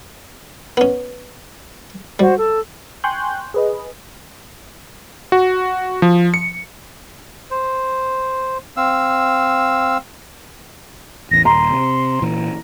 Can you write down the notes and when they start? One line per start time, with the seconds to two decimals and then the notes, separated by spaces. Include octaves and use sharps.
0.77 B3 C#4
2.19 G3 F#4 C5
2.38 A4
3.04 G5 G#5 C6 C#6 F#6 G6
3.54 G#4 B4 D#5
5.32 F#4
6.02 F3
6.34 C#7
7.51 C5
8.77 C4 F5 E6
11.31 A1 E2 A#6
11.45 D#1 A#5 C6
11.71 C3
12.22 A#2 E3